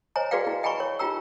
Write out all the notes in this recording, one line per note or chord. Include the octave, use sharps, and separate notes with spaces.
C5 C#5 D#5 G#5 A#5
F#4 G#4 B4 D5 F5 G5
E4
D#5 G5 G#5 A#5 B5 C#6
C#5
D#4 F4 G4 G5 A#5 E6